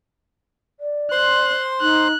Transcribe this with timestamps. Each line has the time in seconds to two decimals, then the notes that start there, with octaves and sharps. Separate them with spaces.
0.80 D5
1.12 C5 C6 F#6
1.81 D#4 F#6